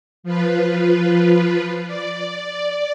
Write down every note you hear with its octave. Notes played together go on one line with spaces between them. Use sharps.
F3 F4 B4
D5